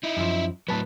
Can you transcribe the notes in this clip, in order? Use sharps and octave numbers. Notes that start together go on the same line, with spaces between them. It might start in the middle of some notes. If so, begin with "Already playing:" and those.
D#4 E4
F#2 F3
A2 F#3 B4 A5